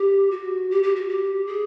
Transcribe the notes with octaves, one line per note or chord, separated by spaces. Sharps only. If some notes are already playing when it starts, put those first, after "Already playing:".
Already playing: G4
F#4
G4
G4
F#4
G4
G#4